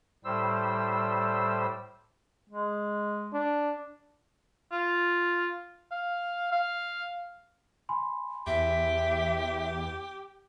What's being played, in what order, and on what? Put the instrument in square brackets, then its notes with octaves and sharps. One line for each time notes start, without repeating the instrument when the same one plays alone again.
[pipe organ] A2 G3 C5 E6
[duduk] G#3
[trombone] D4
[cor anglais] F4
F5
F5
[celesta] G#5 B5 C6
[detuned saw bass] E2 [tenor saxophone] G4 [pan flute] E5